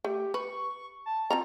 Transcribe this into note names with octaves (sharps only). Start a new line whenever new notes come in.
A3 G4
B4 C#6
A5
C4 F4 A#5